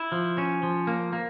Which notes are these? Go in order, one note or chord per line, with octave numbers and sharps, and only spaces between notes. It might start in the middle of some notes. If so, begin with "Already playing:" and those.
Already playing: E4
F3
C#4
F3
A#3
A#3